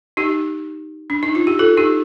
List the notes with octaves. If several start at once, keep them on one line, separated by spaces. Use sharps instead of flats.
D#4 G4
D4
D#4
F4
G4
F4 A4
D#4 G4